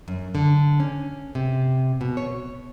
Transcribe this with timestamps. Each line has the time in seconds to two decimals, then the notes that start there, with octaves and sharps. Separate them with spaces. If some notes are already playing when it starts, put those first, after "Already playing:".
0.08 F#2
0.35 D3
0.80 C#4
1.35 C3
2.01 B2
2.17 C#5